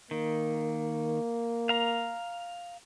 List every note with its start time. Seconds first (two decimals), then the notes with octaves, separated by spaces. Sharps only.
0.11 D#3 A#3
1.69 F5 A#5